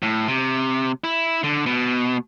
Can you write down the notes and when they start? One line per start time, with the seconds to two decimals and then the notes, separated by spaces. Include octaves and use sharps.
0.02 A2
0.28 C3
1.04 E4
1.43 D3
1.66 B2